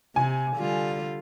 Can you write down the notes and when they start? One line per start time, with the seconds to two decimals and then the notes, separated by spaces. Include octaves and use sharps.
0.16 C3 G#5
0.57 D3 G3 F4